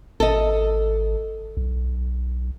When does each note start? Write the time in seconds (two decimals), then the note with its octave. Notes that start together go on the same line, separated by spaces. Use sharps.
0.20 G#1 A4 D#5
1.57 B1